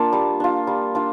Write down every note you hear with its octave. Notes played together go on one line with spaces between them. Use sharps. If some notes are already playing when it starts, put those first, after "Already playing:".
Already playing: A#3 D4 F4 A5
G3
D4 F4
G3
D4 F4